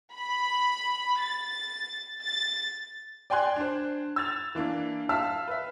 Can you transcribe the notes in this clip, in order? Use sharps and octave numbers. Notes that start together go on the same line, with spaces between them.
B5
A6
A6
D5 G5 G#5 C6 F#6 G#6
D4 C5
E6 G#6 A6 F7
E3 A#3 D4
E5 F5 A5 E6 F6
B4 E5